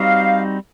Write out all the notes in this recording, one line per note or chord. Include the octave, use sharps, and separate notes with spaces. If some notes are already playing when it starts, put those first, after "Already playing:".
Already playing: G3 C4 D#4 F#4 F5